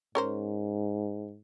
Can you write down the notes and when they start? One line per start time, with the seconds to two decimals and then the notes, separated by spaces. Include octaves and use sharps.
0.15 G#2 C#4 A#4 C5